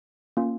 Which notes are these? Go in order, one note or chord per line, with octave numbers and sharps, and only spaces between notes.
A#3 C#4 F4